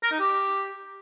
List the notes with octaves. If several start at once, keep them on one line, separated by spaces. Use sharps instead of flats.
A#4
D#4
G4